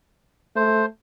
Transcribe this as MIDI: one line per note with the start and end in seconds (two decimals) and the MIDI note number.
0.56 0.85 57
0.56 0.86 72